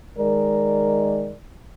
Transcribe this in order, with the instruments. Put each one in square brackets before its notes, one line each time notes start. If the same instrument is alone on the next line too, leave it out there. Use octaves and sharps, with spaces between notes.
[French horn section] D#3 G#3 A#4 D5